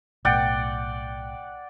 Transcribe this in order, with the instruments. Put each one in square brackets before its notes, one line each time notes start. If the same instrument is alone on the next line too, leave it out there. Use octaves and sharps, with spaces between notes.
[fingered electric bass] B1 A2 [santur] D5 F#5 G5